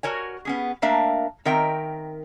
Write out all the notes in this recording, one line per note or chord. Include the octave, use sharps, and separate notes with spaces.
F#4 A#4 C#5 G#5
B3 C#4 G#4
A3 A#3 D4 A#4 E5 F5
D#3 C4 A#4 E5 G5